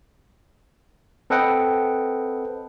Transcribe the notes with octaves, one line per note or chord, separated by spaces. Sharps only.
C4 A4 B4 D#5 F#5 G5